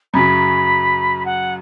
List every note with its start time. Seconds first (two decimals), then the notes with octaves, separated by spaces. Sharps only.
0.13 F#2 C#3 F#3 B5
1.25 F#5